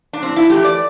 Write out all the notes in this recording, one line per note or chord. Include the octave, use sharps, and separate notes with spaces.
D4
A2 C4
E4
E3 A3 G4
D5